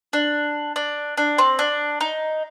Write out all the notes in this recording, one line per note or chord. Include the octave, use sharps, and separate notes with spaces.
D4
D4
D4
C4
D4
D#4